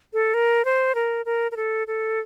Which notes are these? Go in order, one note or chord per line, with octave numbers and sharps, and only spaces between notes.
A4
A#4
C5
A#4
A#4
A#4
A4
A4